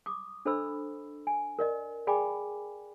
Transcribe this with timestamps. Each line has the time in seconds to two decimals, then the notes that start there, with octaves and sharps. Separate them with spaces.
0.06 D6 D#6
0.45 D4 A4 C5 D#5 B5 E6
1.27 G#5
1.59 A#4 D5 D#5
2.07 G#4 D5 G5 G#5 B5 D6